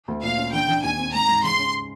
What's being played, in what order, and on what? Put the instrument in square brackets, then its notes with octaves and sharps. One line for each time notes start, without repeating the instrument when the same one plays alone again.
[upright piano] D2
[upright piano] A#2 [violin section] F5
[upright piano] C#4
[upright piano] D3 [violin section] G5
[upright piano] D3
[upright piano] D#2 [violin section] G#5
[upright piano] C4
[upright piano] G#2 [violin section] A#5
[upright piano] G#2
[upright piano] C#3 [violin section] C6
[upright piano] C#4